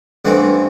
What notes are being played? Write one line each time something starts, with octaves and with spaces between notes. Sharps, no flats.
A1 G2 E3 A3 C4 F#5